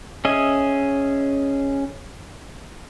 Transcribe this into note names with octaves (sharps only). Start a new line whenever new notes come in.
C#4 G#4 D#5 E5